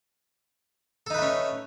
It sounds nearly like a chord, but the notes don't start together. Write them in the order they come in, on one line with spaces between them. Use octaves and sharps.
A4 D#4 B4 A3 C#4